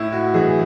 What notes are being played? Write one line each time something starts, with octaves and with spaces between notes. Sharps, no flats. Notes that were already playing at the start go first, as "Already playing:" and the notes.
Already playing: A2 E4
F#4
E3 G#4